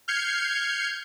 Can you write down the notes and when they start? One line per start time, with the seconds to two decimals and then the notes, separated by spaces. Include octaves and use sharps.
0.08 F6 G6 G#6 C7 C#7